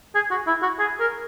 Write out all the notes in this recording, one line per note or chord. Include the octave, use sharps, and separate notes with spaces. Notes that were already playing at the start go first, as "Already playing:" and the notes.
G#4
F#4
E4
F#4
G#4
A#4